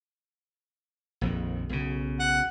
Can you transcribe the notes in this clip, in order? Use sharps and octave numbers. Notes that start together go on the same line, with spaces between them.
A#1 F2 D#3
B1 C#3
F#5